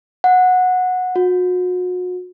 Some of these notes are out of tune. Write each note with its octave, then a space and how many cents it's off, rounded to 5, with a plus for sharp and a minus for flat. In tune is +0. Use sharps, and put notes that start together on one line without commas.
F#5 -15
F#4 -35